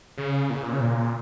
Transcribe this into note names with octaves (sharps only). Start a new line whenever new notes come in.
C#3
A#2
C#3
A#2
C#3
A#2